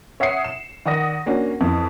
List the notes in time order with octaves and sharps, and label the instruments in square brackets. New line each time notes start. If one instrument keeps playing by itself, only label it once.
[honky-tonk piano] C#5 E5 F#5 D#6 C7 C#7
E7
D#3 D5 F#5 D#6 A#6
A#3 C#4 D4 F#4
F2 E3